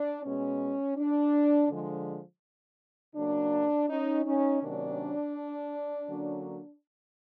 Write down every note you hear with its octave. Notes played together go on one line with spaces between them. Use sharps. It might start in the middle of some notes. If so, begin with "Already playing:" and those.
Already playing: D4
B2 G#3 B3 C#4
D4
D3 F3 G#3
C#3 F#3 A#3 D4
C#4 D#4
C#4 D#4
C3 D#3 F#3 A#3 C#4 D4
D3 F#3 A#3 C#4